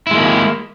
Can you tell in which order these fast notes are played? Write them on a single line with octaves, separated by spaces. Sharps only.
E4 G#3 A#3